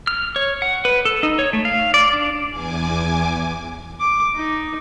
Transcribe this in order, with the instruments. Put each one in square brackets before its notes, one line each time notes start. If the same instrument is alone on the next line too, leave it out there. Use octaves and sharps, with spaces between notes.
[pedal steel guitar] F6
C#5
F#5
B4
A4
D#4
C#5
A3
F5
D5
D4
[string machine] E2 G#5 D6
[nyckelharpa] D6
D#4